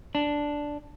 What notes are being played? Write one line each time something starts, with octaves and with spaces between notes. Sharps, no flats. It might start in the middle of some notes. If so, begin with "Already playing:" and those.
D4